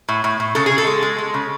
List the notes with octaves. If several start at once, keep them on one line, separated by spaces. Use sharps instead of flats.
A2
A2
A2
C#3 A4
G#4
C#3
A4
G#3
G#3
G#3
C#3